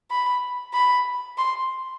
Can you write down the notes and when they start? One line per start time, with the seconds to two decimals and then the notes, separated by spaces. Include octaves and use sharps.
0.11 B5
0.74 B5
1.38 C6